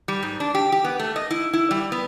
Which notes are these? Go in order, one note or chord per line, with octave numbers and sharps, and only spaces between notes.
G3
G#2
D4
G4
G4
B3
A3
D#5
E4
E4
G3
B3